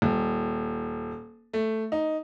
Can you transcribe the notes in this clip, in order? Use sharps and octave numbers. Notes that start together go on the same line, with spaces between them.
D#1
A3
D#4